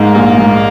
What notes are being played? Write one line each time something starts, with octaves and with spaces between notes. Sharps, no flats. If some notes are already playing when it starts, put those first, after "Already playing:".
Already playing: G#2 G#3 A#3
A#1
G#2